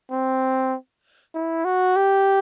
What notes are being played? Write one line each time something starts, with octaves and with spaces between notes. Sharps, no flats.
C4
E4
F#4
G4